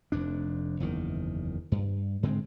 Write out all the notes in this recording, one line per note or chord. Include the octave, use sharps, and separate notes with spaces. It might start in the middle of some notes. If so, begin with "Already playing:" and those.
F1 F2 D4
F#1 E2 D#3
G2
G#2 D3 G#3 C4